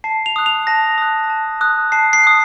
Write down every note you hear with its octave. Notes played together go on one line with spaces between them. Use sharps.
A5 C7
F7
D#6 F#6
F7
A5 A#6
D#6 F#6
A5
D#6 F#6
A5 C7
C7
D#6 F#6